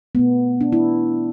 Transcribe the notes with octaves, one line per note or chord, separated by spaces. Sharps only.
B2 A3 B3
D4
E4